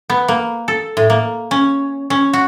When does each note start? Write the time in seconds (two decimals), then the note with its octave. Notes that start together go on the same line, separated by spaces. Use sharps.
0.10 B3
0.28 A#3
0.68 A4
0.97 A2
1.10 A#3
1.51 C#4
2.10 C#4
2.33 F#4